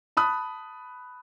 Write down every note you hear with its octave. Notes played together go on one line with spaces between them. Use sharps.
A5 B5 D#6 F#6